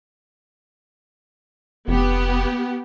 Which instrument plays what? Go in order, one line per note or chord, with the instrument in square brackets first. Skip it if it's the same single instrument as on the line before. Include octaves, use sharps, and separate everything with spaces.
[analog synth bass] F1 [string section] B3 G4